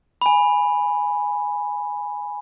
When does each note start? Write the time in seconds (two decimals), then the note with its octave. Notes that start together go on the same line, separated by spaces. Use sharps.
0.22 G#5 B5